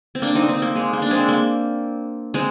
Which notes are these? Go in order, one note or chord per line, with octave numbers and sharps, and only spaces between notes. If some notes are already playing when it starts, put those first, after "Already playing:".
C4
A#3 D4
C4 D#4
C4 D#4
A#3
G#3
A#3
D4
G#3 C4
A#3
G#3 C4